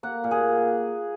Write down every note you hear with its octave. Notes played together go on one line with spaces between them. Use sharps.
A#3 F#5
A#2
G#4